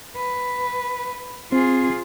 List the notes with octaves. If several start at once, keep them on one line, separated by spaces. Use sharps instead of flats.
B4
C4 F4 G#4